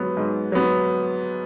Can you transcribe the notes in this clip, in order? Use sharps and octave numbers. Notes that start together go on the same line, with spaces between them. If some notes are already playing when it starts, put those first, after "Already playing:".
Already playing: G#2 F#3 B3
G#2
F#3 B3